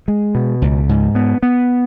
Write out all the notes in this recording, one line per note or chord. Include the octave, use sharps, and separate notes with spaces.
G#3
B2
C#2
G#2
B3
B3